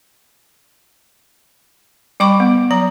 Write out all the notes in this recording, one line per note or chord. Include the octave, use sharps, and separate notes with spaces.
G3 G5 B5 C#6 D6
B3
F#3 A#5